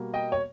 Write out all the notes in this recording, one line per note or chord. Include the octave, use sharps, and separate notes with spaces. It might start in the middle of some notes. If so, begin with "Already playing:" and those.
Already playing: B2 G3 A#3
D#5 G5
C#5